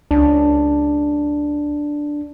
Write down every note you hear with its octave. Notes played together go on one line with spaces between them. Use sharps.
C#2 D4